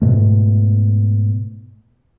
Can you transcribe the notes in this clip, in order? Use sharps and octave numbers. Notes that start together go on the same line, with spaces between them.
G#2 B2 A3